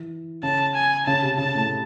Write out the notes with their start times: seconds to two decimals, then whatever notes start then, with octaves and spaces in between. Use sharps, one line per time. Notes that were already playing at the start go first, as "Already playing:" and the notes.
Already playing: E3
0.43 C#3 A5
0.75 G#5
1.07 C#3 A5
1.22 C3
1.38 C#3 A5
1.55 A2